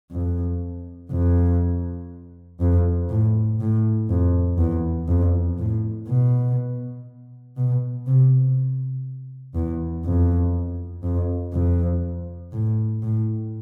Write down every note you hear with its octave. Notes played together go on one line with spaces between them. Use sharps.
F2
F2
F2
A2
A2
F2
E2
F2
A2
B2
B2
C3
E2
F2
F2
F2
A2
A2